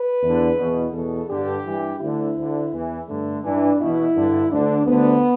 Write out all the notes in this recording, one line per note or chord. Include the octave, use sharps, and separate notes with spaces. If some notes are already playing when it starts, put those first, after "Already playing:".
Already playing: B4
E2 D3
E2 B2
E2 B2 A4
G2 D3 G4
G2 E3
D2 D3 E4
D2 D3
E2 E3
G2 D3 A3
G2 E3 D4
E2 B2 E4
G2 D3
D2 D3 D4
D2 D3 B3